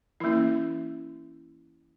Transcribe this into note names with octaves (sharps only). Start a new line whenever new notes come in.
E3 A#3 C#4 E4